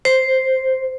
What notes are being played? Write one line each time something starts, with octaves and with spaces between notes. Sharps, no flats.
C5